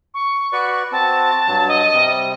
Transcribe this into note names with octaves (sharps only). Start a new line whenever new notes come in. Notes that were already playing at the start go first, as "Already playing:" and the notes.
C#6
F#4 B4 D5
C4 F#4 A5
G2 F#3
D#5
C3 G3